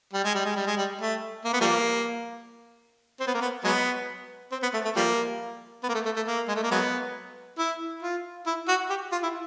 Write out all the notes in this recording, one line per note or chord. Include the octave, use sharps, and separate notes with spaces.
G3
G#3
G3
G#3
G3
G#3
G3
A3
A#3
B3
F3 G3 A#3
C4
B3
A#3
B3
F#3 G#3 B3
C4
B3
A3
A3
F3 G3 A#3
B3
A#3
A3
A3
A3
A#3
G#3
A3
A#3
F#3 G#3 B3
E4
F4
E4
F#4
G4
F4
E4